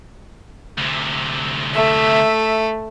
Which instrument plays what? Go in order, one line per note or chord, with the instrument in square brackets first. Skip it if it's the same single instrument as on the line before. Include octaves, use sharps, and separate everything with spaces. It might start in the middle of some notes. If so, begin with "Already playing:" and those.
[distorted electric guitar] D2 C3
[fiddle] A3 [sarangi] E5